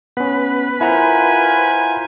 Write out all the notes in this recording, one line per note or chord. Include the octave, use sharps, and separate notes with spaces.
B3 C#4 B4
E4 F4 A#4 C5 F#5 G#5 A#5